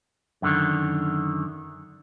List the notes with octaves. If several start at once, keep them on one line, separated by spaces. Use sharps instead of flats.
F#2 D3 D#3